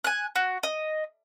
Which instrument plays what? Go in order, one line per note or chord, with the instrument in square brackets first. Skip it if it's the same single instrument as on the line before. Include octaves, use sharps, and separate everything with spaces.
[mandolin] G#5 F#6
F#4
D#5